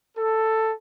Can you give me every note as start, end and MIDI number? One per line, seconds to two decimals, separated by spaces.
0.17 0.72 69